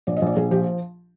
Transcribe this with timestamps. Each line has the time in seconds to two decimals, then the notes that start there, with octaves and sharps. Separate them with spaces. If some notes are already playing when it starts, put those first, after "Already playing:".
0.07 A#1 D5
0.17 D#5
0.22 A#1 D5
0.36 A#1 G#4
0.51 F3 G4